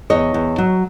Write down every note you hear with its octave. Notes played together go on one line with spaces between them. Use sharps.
E2 C#5 D#5
E2
F#3